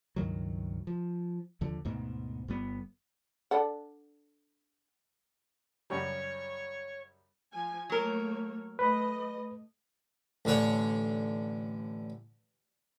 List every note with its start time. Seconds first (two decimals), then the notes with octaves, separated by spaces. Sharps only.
0.16 C#2 G2 D#3 F#3
0.87 F3
1.61 D#2 D3 F3
1.85 D2 G#2 B2
2.48 G1 G3 B3
3.51 D4 A4 F#5
5.90 F#2 C#3 G3 C#5
7.51 F3 G#5
7.90 F#3 A3 A#3 A#4 C#5
8.79 A3 B4 D#5
10.45 A1 D3 C#5 F#5